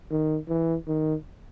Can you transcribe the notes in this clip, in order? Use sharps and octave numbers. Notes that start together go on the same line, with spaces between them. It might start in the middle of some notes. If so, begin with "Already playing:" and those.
D#3
E3
D#3